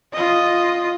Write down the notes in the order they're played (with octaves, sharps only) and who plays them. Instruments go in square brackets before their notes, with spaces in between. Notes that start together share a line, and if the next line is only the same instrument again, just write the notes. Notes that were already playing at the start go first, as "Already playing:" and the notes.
[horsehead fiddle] F4 D#5